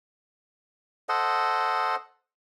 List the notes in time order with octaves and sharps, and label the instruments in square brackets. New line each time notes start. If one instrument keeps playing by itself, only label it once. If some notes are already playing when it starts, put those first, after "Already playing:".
[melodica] A4 C5 D#5 F#5